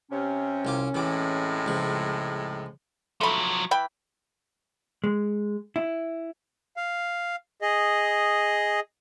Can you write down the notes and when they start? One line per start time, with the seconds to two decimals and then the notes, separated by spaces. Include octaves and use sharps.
0.11 C3 C#4
0.65 C2 F4 D6
0.95 A2 C3 E3 G#3 D6
1.66 C#2 F3
3.21 F3 F#3 A3 B5
3.71 E3 G5 B5
5.04 G#3
5.76 E4
6.77 F5
7.62 G#4 D#5